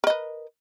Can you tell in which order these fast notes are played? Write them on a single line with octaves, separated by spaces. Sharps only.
A#4 D#5 B4